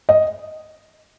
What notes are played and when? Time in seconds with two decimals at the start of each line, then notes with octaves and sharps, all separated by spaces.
0.09 D#5